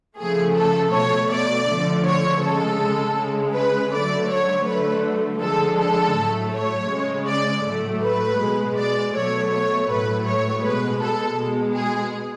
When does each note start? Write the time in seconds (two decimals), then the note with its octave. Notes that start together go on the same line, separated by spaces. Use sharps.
0.18 C#3 F3 A3 G#4
0.56 A4
0.93 B2 A3 C#5
1.30 D5
1.68 D3 F3 A3
2.05 C#5
2.42 C#3 G#3 A4
3.17 C#3 G#3
3.54 B4
3.92 D3 F#3 A3 D5
4.29 C#5
4.66 D3 F#3 A3 B4
5.41 D3 F3 G#3 A4
5.78 A4
6.16 A2 F#3 A3
6.53 C#5
6.90 C#3 G#3
7.28 D5
7.65 A2 F#3 A3
8.02 B4
8.39 B2 G#3
8.77 D5
9.14 B2 F#3 A3 C#5
9.52 C#5
9.89 A2 F#3 A3 B4
10.26 C#5
10.63 B2 G#3 B4
11.01 A4
11.38 B2 G#3
11.75 G#4